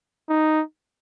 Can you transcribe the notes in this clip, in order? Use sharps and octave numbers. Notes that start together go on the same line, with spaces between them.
D#4